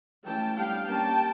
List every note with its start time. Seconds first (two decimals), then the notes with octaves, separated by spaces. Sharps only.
0.25 E3 A3 C#4 G5 A5
0.56 G3 B3 D4 F5 G5
0.88 G3 A#3 C#4 G5 A5